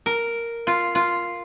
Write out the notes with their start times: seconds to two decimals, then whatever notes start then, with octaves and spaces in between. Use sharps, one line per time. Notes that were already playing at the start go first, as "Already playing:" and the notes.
0.06 A#4
0.67 F4
0.95 F4